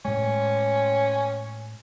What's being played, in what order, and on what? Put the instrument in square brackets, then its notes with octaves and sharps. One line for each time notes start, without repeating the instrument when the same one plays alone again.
[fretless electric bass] A2 G#3 [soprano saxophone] C#4